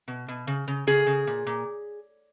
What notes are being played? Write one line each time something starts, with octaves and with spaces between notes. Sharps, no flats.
B2
B2
C#3
C#3
C#3 G#4
C#3
A#2
A#2